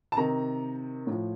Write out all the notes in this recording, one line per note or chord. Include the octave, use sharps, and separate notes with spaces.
A5
C3 D#3 A#5
A2 F3